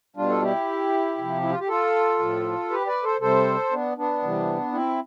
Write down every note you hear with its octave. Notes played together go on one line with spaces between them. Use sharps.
B2 G3 D4 F4
A4
E4 G4
C3 F3
E4
F4
G4
F4 A4
A2 F3
G4 B4
B4 D5
A4 C5
C3 G3 A4 C5
B3 D4
B3 D4
C3 E3 G3
C4 E4